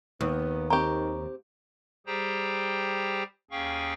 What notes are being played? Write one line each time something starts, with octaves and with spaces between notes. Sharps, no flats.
D#2 B3
D#3 C4 G4 A#5 C#6
G3 G4 G#4 C5 G5 A#5
D#2 C#4 G#4 F5 G5 C#6